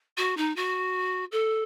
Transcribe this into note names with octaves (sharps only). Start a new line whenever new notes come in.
F#4
D#4
F#4
A4